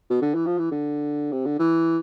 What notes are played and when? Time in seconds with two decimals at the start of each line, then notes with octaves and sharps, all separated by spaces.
0.10 B2
0.22 D3
0.35 E3
0.46 F3
0.58 E3
0.72 D3
1.32 C3
1.46 D3
1.59 E3